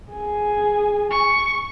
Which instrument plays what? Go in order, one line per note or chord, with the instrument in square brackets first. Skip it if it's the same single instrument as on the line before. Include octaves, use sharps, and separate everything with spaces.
[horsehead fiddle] G#4 G#5
[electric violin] C#6